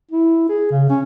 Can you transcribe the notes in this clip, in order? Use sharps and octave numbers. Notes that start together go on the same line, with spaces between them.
E4
G#4
C#3
C#4